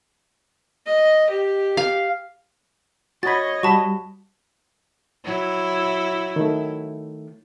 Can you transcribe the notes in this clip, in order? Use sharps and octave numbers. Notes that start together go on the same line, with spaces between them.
D#5
G4
F5
F#4 C#5 D#5 B5 G#6 A6
G3 F#4 A5 B5 C#6
F#3 E4
D#3 A3